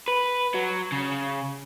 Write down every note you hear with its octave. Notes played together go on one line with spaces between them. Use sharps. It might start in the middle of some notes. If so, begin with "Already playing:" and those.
B4
F#3
C#3